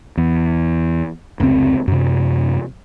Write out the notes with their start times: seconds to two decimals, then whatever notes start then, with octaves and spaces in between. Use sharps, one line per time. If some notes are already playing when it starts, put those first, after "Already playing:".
0.17 E2
1.40 F1 C#2 A2 C4
1.88 F#2 C3